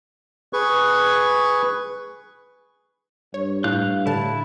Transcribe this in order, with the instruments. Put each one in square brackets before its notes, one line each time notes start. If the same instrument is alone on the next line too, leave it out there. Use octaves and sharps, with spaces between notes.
[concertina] G#4 B4 C#6
[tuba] G2 [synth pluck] C#5
[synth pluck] A2 [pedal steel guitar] F5 F#6 G6
[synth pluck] A2 D3 A5 [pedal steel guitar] E4